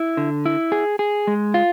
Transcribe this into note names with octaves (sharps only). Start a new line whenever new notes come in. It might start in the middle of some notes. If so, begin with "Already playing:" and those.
Already playing: E4
D3
E4
G#4
G#4
G#3
F4